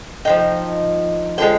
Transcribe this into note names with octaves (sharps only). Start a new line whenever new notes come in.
F3 G#3 D#4 G5
D3 F3 G#3 G5